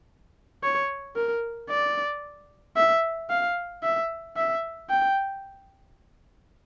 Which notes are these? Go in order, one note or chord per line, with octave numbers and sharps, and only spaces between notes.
C#5
A#4
D5
E5
F5
E5
E5
G5